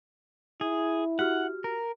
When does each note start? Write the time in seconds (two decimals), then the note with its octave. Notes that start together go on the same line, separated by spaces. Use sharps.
0.61 E4 G#4
1.19 F#4 G4 F#5 F6
1.64 A#4